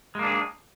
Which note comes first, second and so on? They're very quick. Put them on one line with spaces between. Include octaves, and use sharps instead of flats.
G#3 A#3 D4 G#4